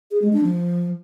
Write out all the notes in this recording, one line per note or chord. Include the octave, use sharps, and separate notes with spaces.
G#4
G#3
D4
F3